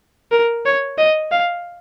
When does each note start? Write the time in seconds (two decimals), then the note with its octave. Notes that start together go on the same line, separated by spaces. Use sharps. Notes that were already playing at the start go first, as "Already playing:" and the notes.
0.32 A#4
0.65 C#5
0.98 D#5
1.31 F5